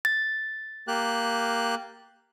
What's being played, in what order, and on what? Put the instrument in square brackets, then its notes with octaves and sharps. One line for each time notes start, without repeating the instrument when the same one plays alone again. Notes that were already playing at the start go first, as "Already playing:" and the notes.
[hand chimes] A6
[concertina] A#3 G4 F#6